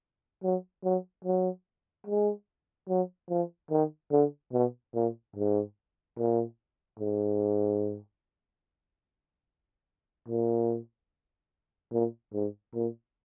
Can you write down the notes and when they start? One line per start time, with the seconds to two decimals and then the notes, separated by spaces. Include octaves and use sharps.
0.43 F#3
0.84 F#3
1.24 F#3
2.06 G#3
2.89 F#3
3.29 F3
3.70 D#3
4.12 D3
4.53 B2
4.94 A#2
5.36 G#2
6.17 A#2
6.99 G#2
10.28 A#2
11.92 A#2
12.33 G#2
12.74 A#2